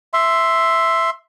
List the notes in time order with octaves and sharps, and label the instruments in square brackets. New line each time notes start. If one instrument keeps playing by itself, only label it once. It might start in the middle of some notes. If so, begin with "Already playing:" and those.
[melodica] E5 C6